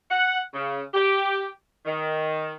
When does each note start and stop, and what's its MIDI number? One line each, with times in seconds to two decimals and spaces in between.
0.11 0.40 78
0.54 0.82 49
0.94 1.49 67
1.86 2.54 51